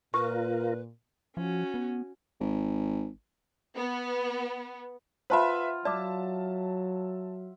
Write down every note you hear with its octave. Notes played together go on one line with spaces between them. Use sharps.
A#2 F4 A#4 B4 C#6
F3 C#4 F#4
B3
G#1
B3
F4 B4 C5 E5 F#5 A5 B5
F#3 D5 E5 A5 D6